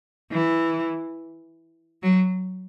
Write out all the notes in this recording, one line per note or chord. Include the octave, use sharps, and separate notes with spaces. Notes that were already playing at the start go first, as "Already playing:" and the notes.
E3
F#3